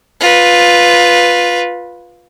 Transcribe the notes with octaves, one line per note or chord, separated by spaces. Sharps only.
F4 B4